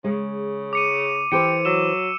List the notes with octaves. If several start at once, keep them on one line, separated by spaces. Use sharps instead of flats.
C#3 G#3
D6 C#7 D#7
E3 G4 A4 C5 C#7
F#3 E6 E7